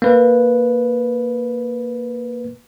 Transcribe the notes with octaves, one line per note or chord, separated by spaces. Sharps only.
A#3 B4